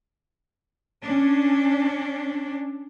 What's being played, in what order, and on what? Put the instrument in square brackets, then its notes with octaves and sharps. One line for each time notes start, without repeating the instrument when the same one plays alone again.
[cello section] C#4 D4